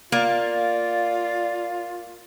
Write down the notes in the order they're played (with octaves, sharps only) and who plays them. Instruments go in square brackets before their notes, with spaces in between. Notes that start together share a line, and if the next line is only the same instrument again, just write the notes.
[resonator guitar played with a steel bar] A#3 [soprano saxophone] F4 [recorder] D5